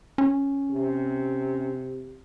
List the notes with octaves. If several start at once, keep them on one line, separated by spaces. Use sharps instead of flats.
C#4
C3